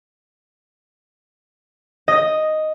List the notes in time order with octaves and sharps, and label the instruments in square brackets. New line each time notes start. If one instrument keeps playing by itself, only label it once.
[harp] D#5